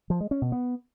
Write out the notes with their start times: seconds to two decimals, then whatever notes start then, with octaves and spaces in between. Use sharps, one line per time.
0.10 F3
0.21 G#3
0.31 C#4
0.42 B2
0.52 B3